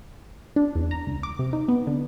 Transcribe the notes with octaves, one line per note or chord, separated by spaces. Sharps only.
D4
E2
A#5
C#2
D6
C3
D#4
B3
D3